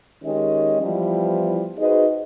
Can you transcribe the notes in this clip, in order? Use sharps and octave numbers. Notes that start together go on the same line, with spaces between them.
D#3 G#3 C#4 G4 D#5
E3 F3 G3 B3 E4
D#4 F#4 G#4 B4 C5 D#5